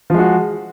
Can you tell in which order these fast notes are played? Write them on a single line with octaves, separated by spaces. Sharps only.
F3 G#3 F#4